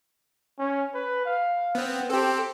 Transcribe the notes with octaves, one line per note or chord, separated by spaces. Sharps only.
C#4
B4
F5
B3 C4
C4 G4 A4